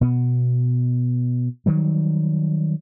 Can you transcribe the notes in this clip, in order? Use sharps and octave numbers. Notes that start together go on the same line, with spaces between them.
B2 B3
D#3 F#3 G3